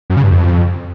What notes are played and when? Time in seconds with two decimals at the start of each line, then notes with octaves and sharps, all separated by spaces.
0.10 F#2
0.17 C#3
0.24 G2
0.31 F2